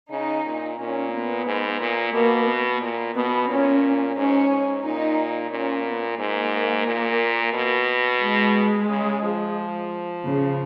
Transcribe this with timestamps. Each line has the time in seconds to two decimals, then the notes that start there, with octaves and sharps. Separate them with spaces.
0.11 C#3 D#4
0.45 A#2
0.78 A#2 C#4
1.13 B3
1.46 G#2
1.80 A#2
2.14 B2 A#3
2.47 B3
2.82 A#2
3.15 B2 B3
3.49 A#2 C#4
4.16 G#2 C#4
4.50 G#2
4.84 A#2 D#4
5.51 A#2 C#4
5.85 B3
6.19 G#2 A#3
6.87 A#2
7.54 B2
8.21 G#3
8.89 C#3
9.23 F3
10.24 C#3